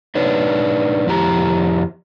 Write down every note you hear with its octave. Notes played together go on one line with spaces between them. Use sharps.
D4 D#4 B4 C#5
F2 E4 G4 A#5